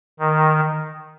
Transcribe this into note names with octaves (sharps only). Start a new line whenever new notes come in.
D#3